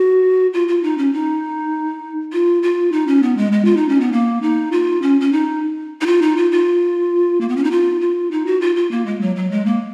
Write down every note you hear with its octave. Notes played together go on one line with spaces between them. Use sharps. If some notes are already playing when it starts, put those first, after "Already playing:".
Already playing: F#4
F4
F4
D#4
C#4
D#4
F4
F4
D#4
C#4
B3
G#3
G#3
F4
D#4
C#4
B3
A#3
D#4
F4
C#4
C#4
D#4
D#4
F4
D#4
F4
F4
A#3
B3
C#4
D#4
F4
F4
D#4
F#4
F4
F4
A#3
G#3
F#3
F#3
G#3
A#3